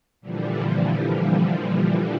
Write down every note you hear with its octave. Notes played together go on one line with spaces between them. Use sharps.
A#2 D3 E3 F3 G3